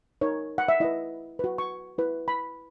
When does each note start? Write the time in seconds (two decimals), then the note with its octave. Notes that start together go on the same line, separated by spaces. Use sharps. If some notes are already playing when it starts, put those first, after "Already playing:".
0.21 D#4 A#4 C#5
0.58 F#5
0.68 E5
0.80 E4 B4 D#5
1.39 F#4 B4
1.58 C#6
1.98 E4 B4
2.28 B5